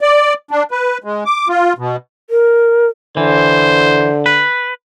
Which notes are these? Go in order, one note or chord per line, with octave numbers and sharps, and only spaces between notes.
D5
D4
B4
G#3
D6
F4
B2
A#4
D3 E3 C5
B4